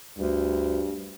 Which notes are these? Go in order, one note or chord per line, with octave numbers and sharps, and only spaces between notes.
D2 G2